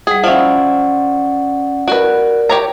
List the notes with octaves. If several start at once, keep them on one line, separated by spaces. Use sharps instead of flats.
G3 G#4 F#5
F3 C#4 E4 D5 F#5
F#4 A#4 B4 D5
G4 C#5 A#5